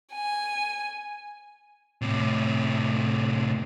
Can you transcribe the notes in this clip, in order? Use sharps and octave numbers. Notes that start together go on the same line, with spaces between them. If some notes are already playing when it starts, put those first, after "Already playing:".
G#5
A2 C3